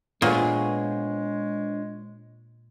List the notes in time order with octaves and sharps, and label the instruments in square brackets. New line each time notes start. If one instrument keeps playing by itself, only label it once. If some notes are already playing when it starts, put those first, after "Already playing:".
[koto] A#2 [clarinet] G#3 [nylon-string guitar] B3 F4 G#4 [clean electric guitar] D4 C5 C#5